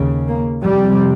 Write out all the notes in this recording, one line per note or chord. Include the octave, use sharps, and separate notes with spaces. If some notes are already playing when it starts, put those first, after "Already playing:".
Already playing: D#2 C#3
A#3
F2 C3 G3